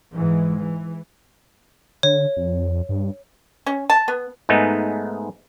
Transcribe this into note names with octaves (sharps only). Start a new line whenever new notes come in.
G#2 E3 G#3
E3
D3 C#5
F2
G2
C#4
A5
B3
G#2 G#3 A3 B3 D#4